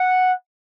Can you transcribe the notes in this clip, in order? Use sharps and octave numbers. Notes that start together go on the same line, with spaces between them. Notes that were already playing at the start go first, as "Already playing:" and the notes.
Already playing: F#5